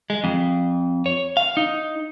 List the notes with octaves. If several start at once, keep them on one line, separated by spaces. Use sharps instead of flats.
G#3
F2
C#5
F5
D#4